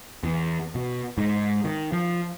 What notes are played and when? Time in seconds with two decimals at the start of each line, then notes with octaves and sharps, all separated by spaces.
0.23 E2
0.75 B2
1.18 G#2
1.64 D#3
1.92 F3